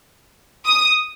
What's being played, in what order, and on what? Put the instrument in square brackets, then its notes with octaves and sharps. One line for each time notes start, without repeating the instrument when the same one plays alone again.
[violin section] D#6